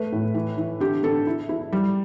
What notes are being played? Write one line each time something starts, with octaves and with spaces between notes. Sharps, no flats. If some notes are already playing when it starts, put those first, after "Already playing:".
Already playing: A3 B4
A2
E3
E3
D3 G4
D3 A4
E4
E4
G3